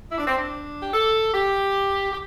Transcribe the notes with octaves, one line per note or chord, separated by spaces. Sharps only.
E4
D4
C4
D4
G4
A4
G4
G4